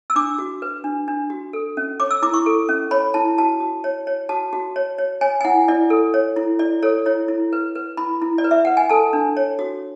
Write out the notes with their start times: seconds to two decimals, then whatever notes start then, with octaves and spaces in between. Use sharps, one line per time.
0.10 E6
0.16 D4 D6
0.39 F#4
0.62 B4
0.84 D4
1.08 D4
1.30 F#4
1.53 A4
1.77 C#4
2.00 C#5 D6
2.11 E6
2.22 E4 D6
2.34 C#6
2.46 A4
2.69 C#4
2.91 C#5 B5
3.14 E4 A5
3.38 F#4 A5
3.60 F#4
3.84 C#5
4.07 C#5
4.29 F#4 A5
4.53 F#4
4.76 C#5
4.98 C#5
5.21 C#5 G#5
5.41 G#5
5.45 E4 F#5
5.68 E4 D5
5.90 A4
6.14 C#5
6.36 E4
6.59 E4 D5
6.83 A4 C#5
7.06 E4 C#5
7.28 E4
7.53 B4
7.75 B4
7.97 E4 B5
8.22 E4
8.38 D5
8.44 B4
8.51 E5
8.65 B4 F#5
8.77 G#5
8.90 A4 A5
9.13 D4
9.37 C#5
9.59 F#4